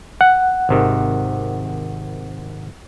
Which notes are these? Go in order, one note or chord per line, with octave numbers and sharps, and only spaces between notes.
F#5
G#1 C3 D#3